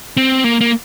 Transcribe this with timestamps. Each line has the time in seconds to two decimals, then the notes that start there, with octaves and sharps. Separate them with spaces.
0.17 C4
0.44 A#3
0.61 A#3